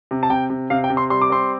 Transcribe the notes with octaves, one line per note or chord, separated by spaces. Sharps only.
C3
A5
C3 G5
C3
C3 F5
G5
C3
C6
G3 C6
D6
C4 C6